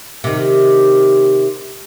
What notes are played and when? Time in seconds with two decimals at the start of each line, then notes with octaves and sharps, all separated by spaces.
0.24 C3 D#3